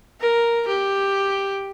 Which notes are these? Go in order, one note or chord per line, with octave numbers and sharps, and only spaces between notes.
A#4
G4